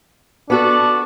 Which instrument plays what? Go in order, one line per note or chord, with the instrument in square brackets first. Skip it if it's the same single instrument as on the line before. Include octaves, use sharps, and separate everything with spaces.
[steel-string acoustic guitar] B3 F#4 A4 [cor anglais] D4